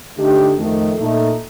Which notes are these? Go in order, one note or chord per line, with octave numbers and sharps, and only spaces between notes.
D3 A3 D#4 G4
F2 D#3 A3
A#2 A3 D#4 A4